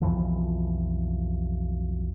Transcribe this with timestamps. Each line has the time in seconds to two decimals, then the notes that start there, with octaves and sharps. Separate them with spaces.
0.01 B1 F2 E3 F3